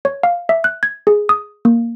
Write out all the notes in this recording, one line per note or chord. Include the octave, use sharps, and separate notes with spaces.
C#5
F5
E5
F#6
G#6
G#4
D#6
A#3